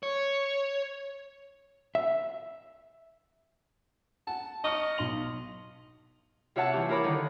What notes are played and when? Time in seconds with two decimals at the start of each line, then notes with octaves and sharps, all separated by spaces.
0.03 C#5
1.95 E5
4.27 F#5 A5
4.64 D#5 C#6 F6 C#7
4.98 B1 C6 F7
6.56 C3 F4 C#5 E5 F#5 A5
6.72 E3 E4 G4 C#6
6.89 E4 F4 A#4 C#5 B5 D6
7.04 D3 D#3